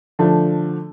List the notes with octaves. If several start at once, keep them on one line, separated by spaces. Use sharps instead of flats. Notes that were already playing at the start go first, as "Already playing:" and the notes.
D3 F3 A3